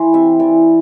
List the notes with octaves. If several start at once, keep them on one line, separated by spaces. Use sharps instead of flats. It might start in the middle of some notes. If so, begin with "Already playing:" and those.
Already playing: E3 C5
C3 E5
E3 D5